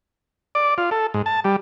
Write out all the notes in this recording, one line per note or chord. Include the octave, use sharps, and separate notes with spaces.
D5
F4
A4
G#2
A5
G3